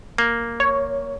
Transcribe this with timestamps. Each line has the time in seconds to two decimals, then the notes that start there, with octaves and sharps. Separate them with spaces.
0.18 A#3
0.60 C#5